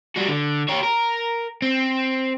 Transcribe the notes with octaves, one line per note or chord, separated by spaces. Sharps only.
G3 F#4
D3
G4 C#5
A#4
C4